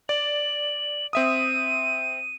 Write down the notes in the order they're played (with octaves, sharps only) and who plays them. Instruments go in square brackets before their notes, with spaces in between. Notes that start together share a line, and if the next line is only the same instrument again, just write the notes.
[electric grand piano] D5 [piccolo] F#7
[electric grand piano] C4 E5 D#6 [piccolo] D#7